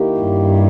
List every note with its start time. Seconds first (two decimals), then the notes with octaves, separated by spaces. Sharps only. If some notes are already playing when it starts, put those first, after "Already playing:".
Already playing: D#3 A#3 E4 G4
0.19 G2